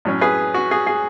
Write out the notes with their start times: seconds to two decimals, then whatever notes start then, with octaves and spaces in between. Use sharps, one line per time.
0.05 A2 F#3 C#4
0.21 G#4 B4
0.54 F#4
0.71 G#4
0.87 G#4